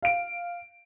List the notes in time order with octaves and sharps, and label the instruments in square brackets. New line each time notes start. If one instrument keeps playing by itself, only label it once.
[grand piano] F5 D7